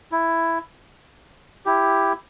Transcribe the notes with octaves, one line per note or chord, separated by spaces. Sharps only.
E4
E4 G4